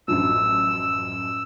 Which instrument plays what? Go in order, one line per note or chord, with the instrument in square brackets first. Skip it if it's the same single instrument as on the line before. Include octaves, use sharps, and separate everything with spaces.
[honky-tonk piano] A1 F#2 F3 [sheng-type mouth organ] E6